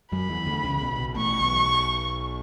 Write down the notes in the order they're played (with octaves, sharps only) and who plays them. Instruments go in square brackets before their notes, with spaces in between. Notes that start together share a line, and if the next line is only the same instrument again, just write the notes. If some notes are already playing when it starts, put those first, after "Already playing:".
[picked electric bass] F#2 F#3 [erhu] B5
[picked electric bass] E2 E3
D2 D3
C#2 C#3
B1 B2
B1 B2
[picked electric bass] A1 A2 [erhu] C#6
[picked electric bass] B1 B2